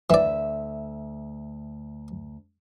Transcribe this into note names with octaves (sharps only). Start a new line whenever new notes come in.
D2 E3 D5 E5